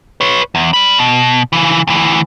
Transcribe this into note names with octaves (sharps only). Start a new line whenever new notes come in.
B4 C#5
E2
D5 B5
B2
C#3 E3
D2 E3